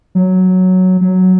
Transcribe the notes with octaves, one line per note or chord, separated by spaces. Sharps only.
F#3
F#3